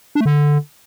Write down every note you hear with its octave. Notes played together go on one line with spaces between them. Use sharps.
D4
A3
D3